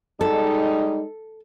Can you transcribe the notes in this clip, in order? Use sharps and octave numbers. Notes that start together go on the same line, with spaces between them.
G3 G#3 D#4 A4